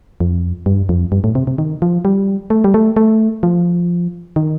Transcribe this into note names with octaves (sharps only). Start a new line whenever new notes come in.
F2
G2
F2
G2
A2
C3
C3
D#3
F3
G3
A3
G3
A3
A3
F3
D#3